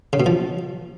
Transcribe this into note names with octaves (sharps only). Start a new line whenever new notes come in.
C#3
B2
F3